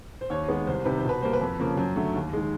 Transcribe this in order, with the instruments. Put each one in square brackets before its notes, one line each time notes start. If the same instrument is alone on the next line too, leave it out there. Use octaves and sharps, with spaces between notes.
[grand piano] C5
D#2 C#5
D#3 G#3 B3
C2 C5
C3 D#3 G3 B4
C5
B2 B4
G3 A#3 C5
B4
F2
C#3 F3 A#3
F#2
D3 F#3 A3
D#2
D#3 G#3